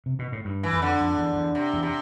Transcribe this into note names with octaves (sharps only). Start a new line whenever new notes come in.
C3
B2
A2
G2
E3
F2
D3
F2
E2
E2
C3
E2
C3